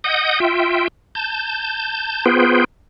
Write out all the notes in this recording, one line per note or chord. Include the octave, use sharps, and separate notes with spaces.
D#5 F#5 D#6 G6
F4 E5 G5
A5 G6
B3 F4 G#4 B4 C5 G5